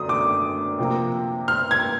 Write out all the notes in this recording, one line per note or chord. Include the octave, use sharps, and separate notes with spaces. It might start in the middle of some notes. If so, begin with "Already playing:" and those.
Already playing: F#2 D3 F#3 A3 D#6
D6
C3 F3 A#3
F6
G#6